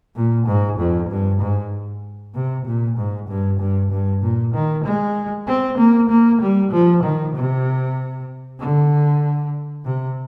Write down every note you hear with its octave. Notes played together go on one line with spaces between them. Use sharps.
A#2
G#2
F2
G2
G#2
C3
A#2
G#2
G2
G2
G2
A#2
D#3
G#3
C4
A#3
A#3
G3
F3
D#3
C3
D3
C3